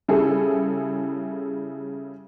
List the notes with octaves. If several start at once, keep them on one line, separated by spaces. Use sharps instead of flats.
C#3 G3 E4 G#4 A4